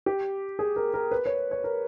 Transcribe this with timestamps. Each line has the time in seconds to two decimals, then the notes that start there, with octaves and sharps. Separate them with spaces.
0.06 G4
0.59 G#4
0.76 A#4
0.94 A#4
1.11 B4
1.26 C#5
1.51 C#5
1.64 A#4